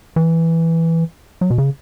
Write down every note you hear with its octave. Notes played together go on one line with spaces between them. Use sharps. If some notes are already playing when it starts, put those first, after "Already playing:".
E3
F#3
B2
C#3